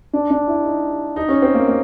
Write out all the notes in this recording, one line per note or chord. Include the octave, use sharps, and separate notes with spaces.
D4
D4
E4
D#4
D#4
C#4
C4
A#3
A#3